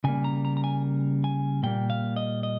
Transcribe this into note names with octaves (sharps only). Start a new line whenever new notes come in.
C#3 G3 A#3 G#5
A#5
A#5
A#5
G#5
G#5
A#2 G3 A#3 G5
F5
D#5
D#5